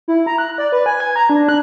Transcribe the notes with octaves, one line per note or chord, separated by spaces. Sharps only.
E4
A#5
F#6
D5
B4
G#5
G#6
A#5
D4
F#6